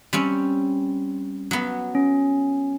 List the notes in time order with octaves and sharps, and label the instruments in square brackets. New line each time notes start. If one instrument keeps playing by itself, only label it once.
[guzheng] G3 C4 C#4
F#3 B3
[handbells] C#4